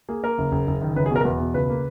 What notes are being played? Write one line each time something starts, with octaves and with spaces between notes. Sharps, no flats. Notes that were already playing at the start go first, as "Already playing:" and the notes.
A#3 G#4
A#3 A#4
F#1
F#1
F#1
D#3
F#1 B4
G#4
B2 A#4
A#4
E2 B4
B2
C#2 B4
A#3